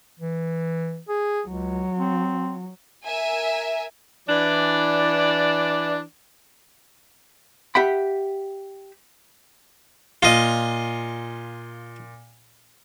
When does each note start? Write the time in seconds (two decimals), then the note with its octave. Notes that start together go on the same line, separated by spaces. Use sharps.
0.20 E3
1.09 G#4
1.48 C#2 F#3
1.98 C4
3.05 A#4 E5 G#5
4.29 E3 D4 D5
7.75 G4 E5 F#5 G5 B5
10.23 A#2 F4 D#5